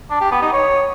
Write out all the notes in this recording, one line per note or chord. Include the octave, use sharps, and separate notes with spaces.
D4
G4
B3
D#4
C#5